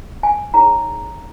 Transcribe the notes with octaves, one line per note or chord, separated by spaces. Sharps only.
G#5
D#4 G#4 C#5 A#5